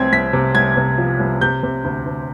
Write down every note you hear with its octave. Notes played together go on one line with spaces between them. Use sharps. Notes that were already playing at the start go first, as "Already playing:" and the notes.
Already playing: C2 C4 G#6
C2 B6
C3
C2 G#6
C3
F3
C2
C3 G6
C3
D2
D2